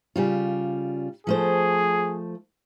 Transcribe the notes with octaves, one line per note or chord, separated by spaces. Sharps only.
C#3 G3 F4
F3 A3 G#4 C5